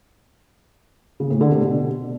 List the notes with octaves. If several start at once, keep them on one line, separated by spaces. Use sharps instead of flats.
C#3
A2
D3
C3
B2